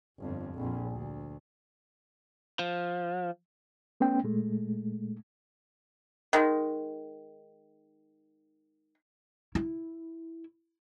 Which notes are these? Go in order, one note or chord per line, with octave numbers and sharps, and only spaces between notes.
G1 F2
A#1 F2
D2
F3
A3 B3 C#4 G5
A#2 G#3 A3
D#3 G#3
E4